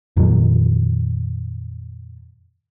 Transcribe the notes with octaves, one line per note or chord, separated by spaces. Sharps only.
F2 A#2 D#3 F#3